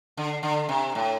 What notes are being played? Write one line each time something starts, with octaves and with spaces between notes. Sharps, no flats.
D3
D3
C3
A2